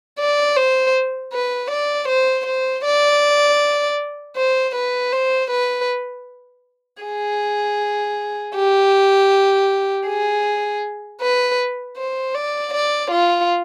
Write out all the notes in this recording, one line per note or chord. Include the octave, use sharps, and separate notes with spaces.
D5
C5
B4
D5
C5
C5
D5
C5
B4
C5
B4
G#4
G4
G#4
B4
C5
D5
D5
F4